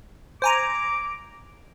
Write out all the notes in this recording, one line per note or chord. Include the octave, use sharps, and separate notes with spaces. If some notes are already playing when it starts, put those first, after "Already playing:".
C5 G#5 A#5 D6